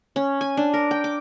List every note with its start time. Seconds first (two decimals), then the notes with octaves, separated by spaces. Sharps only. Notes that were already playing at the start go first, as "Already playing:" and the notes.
0.16 C#4
0.41 G#5
0.57 D4
0.74 A#4
0.91 G5
1.04 D6